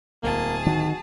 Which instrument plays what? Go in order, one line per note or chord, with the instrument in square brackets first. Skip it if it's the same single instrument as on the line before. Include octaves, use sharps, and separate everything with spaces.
[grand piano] D1 [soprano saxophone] A#3 [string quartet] G#4 A5
[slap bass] D#3 [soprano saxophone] F#4